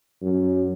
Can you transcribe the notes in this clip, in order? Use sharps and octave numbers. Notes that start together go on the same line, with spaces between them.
F#2